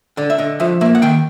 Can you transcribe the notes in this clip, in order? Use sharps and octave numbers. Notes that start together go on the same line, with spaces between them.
D3 D5
E5
D3 D#5
F3 E5
A#3 E5
F#5
D#3 G5